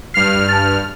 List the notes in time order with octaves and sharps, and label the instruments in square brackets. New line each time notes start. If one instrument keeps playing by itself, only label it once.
[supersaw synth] G2 F6 [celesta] C7
[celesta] A5 A6